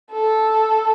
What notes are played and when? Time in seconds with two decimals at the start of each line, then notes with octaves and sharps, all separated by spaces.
0.12 A4